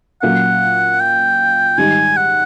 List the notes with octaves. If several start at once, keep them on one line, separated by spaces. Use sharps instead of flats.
A#2 F#3 A#3 C#4 F#4 F#5
G5
G#2 D#3 G3 G#5
F#5